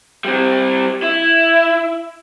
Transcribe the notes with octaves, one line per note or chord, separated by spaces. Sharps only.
G3 C4
E4